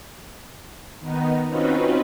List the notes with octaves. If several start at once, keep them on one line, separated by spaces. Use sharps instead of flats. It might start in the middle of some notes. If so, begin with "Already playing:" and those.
D#3 B3 D#4
C4 C#4 D#4 F4 F#4 B4